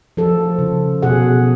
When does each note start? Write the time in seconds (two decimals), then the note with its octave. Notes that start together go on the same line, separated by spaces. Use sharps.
0.17 F3 A4
0.59 C#3
1.02 B2 G#4 F#5